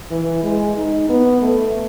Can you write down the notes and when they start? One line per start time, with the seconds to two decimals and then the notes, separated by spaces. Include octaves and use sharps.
0.11 E3
0.43 G#3
0.77 D#4
1.09 B3
1.42 A3